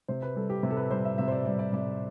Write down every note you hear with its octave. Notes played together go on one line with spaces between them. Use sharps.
C3 C5
B4
G3 A4
G4
C3
A4
B4
G3 C5
E5
C3 E5
C5
D5
G3 D5
D5
C3 D5